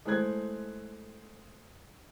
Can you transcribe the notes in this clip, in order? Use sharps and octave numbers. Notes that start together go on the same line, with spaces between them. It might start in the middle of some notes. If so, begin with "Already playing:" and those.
G#3 A3 E4 C5 F#6 G#6